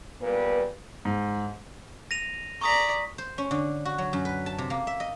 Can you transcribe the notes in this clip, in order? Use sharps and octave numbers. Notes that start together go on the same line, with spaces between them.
A#2 G3 B3 B4
G#2
A#6 D#7 F7
D5 A#5 C#6 D#6 B6
C5
C#4
D3
F#4
F#3
F#2
B4
A5
C3
A#3
E5
D#5